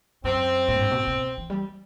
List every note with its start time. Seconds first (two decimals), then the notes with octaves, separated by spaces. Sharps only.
0.24 F#2 C4
0.68 A2
0.75 G2
0.91 B2
1.07 B2
1.38 E3
1.50 G3